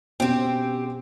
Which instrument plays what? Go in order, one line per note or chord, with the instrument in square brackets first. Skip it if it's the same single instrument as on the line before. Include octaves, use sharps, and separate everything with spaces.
[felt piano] B2 C#4 G5 [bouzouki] C4 G4